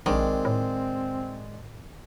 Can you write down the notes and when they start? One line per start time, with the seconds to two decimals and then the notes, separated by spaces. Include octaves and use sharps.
0.06 A#1 D#3 G#3 C4 D4
0.45 A2